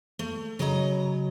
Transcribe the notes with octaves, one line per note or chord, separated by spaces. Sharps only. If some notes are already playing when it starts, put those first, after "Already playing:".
A3
C#3 F#3 D#5 A5 A#5